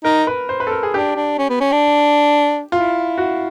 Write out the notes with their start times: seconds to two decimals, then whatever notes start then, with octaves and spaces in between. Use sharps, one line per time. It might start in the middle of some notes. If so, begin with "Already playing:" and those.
0.05 D#4 A#4
0.27 B4
0.49 C5
0.60 B4
0.67 A4
0.71 A#4
0.83 G#4
0.94 D4 G4
1.16 D4
1.39 C#4
1.50 B3
1.61 C#4
1.72 D4
2.72 E4 F4
3.18 F#4